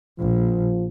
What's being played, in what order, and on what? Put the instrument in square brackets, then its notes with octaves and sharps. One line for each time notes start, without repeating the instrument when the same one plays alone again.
[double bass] A#1 [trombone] F3